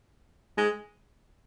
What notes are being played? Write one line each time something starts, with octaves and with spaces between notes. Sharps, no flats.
G#3